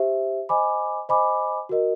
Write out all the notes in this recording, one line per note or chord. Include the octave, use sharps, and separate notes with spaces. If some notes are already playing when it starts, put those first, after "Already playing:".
Already playing: G4 C5 E5
C5 D#5 G#5 B5 D6
C5 D#5 G#5 B5 D6
F#4 A#4 D#5